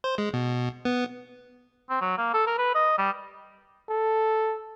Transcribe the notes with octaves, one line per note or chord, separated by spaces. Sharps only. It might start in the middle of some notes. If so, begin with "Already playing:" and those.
C5
G#3
B2
B3
C4
F#3
A#3
A4
A#4
B4
D#5
G3
A4